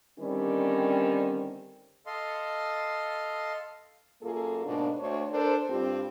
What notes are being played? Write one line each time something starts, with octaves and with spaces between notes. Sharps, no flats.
D3 D#3 G3 C4 C#4
A4 D#5 F5 C6
F#2 A#3 F4 G#4 A4
G#2 B2 A#3 D4
D2 C5 C#5
D4 A4 A#4 C5
G2 C4 F4 G4